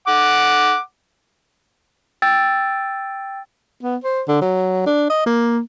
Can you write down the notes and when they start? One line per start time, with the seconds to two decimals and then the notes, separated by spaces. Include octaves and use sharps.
0.08 F#5 D6
2.22 G5 E6 A6
3.83 B3
4.04 C5
4.28 D3
4.41 F#3
4.86 D4
5.09 D#5
5.26 A#3